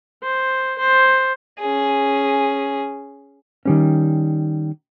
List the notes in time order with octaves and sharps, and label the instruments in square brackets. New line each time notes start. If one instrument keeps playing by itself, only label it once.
[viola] C5
C5
[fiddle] C#4 G#4
[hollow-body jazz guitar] D#3 G3 C#4